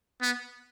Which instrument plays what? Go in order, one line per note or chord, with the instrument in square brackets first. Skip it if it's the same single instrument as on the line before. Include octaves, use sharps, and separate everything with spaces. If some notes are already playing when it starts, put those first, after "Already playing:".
[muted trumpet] B3